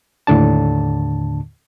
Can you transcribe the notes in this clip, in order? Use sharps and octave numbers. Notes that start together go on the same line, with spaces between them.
D#2 A2 D3 D4 A5